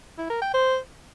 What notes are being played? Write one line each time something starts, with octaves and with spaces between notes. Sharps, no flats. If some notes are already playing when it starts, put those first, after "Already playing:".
E4
A#4
G5
C5